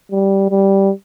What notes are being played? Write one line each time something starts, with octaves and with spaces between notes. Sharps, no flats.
G3
G3